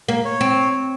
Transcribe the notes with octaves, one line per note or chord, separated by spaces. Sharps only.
A#3
C#5
C4